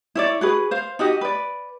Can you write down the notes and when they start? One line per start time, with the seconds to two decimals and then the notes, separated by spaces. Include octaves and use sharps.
0.15 E4 C#5 D5
0.41 F#4 G#4 B4
0.71 C5 F5
0.99 D#4 F#4 G4 D#5
1.21 B4 D5